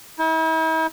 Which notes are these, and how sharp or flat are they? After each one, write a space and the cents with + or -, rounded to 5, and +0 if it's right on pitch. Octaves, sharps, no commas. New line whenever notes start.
E4 -45